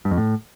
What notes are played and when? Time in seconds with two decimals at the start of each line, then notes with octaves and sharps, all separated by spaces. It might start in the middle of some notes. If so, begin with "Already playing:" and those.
0.05 G2
0.11 F2
0.17 A2